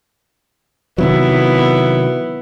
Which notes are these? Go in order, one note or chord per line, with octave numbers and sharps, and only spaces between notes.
C3 D#3 F#3 B3 E4